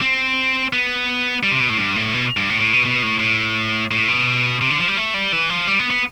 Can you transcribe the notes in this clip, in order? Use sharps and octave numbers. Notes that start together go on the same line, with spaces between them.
C4
B3
G3
C3
B2
A2
G2
A2
B2
G2
A2
A2
B2
B2
A2
A2
A2
B2
C3
D3
F3
G3
A3
G3
E3
F3
G3
B3
B3